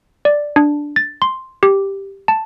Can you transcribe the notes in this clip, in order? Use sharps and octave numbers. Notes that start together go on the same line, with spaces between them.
D5
D4
A6
C6
G4
A5